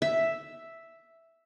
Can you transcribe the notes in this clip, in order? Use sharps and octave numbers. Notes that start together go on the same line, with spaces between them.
E5